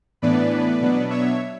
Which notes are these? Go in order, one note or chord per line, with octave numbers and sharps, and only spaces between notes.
A2 E3 B3 D4 B4 D5
B2 F#3 B3 D4
C#5 E5